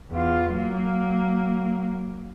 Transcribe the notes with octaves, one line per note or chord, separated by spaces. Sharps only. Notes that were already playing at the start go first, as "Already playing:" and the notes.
E2 F4
F#3 A#3